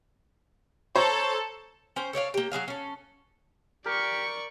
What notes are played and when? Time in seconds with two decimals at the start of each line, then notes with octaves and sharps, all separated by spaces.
0.96 A4 C5 C#5 A#5
1.96 C#4 C5 G5
2.13 A4 C#5 D5 F5
2.34 A#3 G4
2.52 F#3 B3 G#4 F5
2.68 C#4 A4
3.86 G4 A#4 D5 C#6